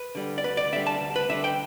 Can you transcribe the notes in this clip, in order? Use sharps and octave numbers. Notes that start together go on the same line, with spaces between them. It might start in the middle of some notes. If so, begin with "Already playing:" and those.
Already playing: B4
D3 G3
D5
D2 B4
D5
D3 G3 E5
A5
D2
B4
D3 G3 E5
G5